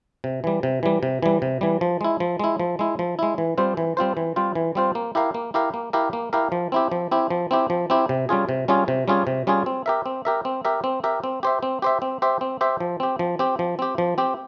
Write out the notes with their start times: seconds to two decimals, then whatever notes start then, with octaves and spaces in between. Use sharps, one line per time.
0.24 C3
0.44 E3 G3
0.63 C3
0.83 E3 G3
1.03 C3
1.23 E3 G3
1.42 C3
1.61 E3 G3
1.81 F3
2.01 G#3 E4
2.20 F3
2.39 G#3 E4
2.60 F3
2.79 G#3 E4
2.99 F3
3.19 G#3 E4
3.38 E3
3.58 G3 C4 F4 C5
3.77 E3
3.97 G3 C4 F4 C5
4.17 E3
4.36 G3 C4 F4 C5
4.55 E3
4.75 G3 C4 F4 C5
4.95 A#3
5.15 E4 G4 A#4 F5
5.34 A#3
5.54 E4 G4 A#4 F5
5.74 A#3
5.93 E4 G4 A#4 F5
6.13 A#3
6.33 E4 G4 A#4 F5
6.52 F3
6.72 C4 E4 G4
6.92 F3
7.11 C4 E4 G4
7.30 F3
7.51 C4 E4 G4
7.70 F3
7.90 C4 E4 G4
8.09 C3
8.29 G3 C#4 F4 G#4
8.49 C3
8.68 G3 C#4 F4 G#4
8.88 C3
9.08 G3 C#4 F4 G#4
9.27 C3
9.47 G3 C#4 F4 G#4
9.66 C4
9.86 G4 A#4 E5
10.06 C4
10.25 G4 A#4 E5
10.45 C4
10.65 G4 A#4 E5
10.84 C4
11.04 G4 A#4 E5
11.24 C4
11.43 G4 C5 E5
11.63 C4
11.82 G4 C5 E5
12.02 C4
12.22 G4 C5 E5
12.41 C4
12.61 G4 C5 E5
12.80 F3
13.00 C4 G4
13.19 F3
13.39 C4 G4
13.59 F3
13.79 C4 G4
13.98 F3
14.18 C4 G4